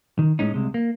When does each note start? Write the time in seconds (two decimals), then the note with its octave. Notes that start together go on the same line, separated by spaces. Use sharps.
0.19 D#3
0.39 A2 C#3 G#3 C#4 D#4
0.54 C2 C3 G#3
0.74 A#3